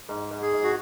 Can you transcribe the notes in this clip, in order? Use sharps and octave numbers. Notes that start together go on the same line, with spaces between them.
G#2
G#2
G#4
G#2
F#4